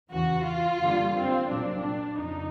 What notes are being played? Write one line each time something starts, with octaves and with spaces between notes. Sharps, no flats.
E2 C#3 E3 F#4
F4
F#2 D3 G3 A#3
C4
C2 A#2 F#3 D4
F2 C#3 D#4